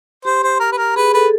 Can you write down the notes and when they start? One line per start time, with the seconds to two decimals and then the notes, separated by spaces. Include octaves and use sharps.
0.25 G4 C5
0.43 C5
0.60 A#4
0.72 B4
0.78 A#4
0.96 G#4 B4
1.14 A4 B4